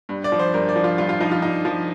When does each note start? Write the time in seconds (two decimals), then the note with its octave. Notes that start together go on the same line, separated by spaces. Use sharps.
0.09 G2
0.24 D5
0.32 F3
0.39 C5
0.54 G2 A#4
0.69 D5
0.76 F3
0.84 F4
0.98 G2 F4
1.09 F4
1.20 F3 D#4
1.32 F4
1.42 G2 D#4
1.65 F3